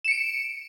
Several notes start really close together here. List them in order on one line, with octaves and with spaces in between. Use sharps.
E7 C#7 D7